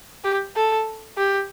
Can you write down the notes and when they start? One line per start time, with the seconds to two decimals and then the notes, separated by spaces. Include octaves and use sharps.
0.24 G4
0.56 A4
1.17 G4